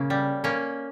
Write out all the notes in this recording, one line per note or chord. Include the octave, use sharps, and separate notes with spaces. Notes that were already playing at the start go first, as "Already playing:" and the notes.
Already playing: C#3 A#3 C#4
G3
A#3 C#4